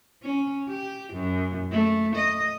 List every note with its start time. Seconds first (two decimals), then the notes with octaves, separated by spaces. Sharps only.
0.23 C#4
0.68 G4
1.13 F#2
1.71 A3
2.15 D#5